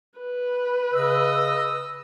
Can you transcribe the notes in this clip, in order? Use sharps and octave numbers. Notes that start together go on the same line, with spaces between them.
B4
C#3 D#5 E6